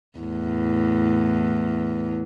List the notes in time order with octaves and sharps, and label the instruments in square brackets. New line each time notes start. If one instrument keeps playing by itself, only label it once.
[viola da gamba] E2 A2